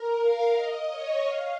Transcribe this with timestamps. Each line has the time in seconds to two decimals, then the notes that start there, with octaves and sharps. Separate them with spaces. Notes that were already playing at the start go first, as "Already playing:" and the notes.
Already playing: A#4
0.22 F5
0.57 D#5
0.90 C#5
1.25 F5